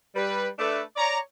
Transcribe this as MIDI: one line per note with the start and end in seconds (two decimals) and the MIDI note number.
0.15 0.48 55
0.15 0.48 71
0.59 0.81 57
0.59 0.81 62
0.59 0.81 71
0.96 1.18 73
0.96 1.18 74
0.96 1.18 82